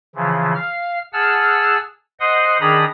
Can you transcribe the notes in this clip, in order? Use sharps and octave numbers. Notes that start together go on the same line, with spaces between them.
C#3 E3 F3
F5 F6
G#4 F#5 A5 E6 F6
C5 D#5 F#5 C6 D#6
D#3 D4 G#4 A#5 B5 D#6